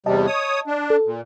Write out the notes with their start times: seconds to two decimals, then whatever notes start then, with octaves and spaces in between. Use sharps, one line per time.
0.06 E2 C3 G3 D#5 A5
0.27 C#5 D#6
0.67 D4
0.90 A4
1.06 A#2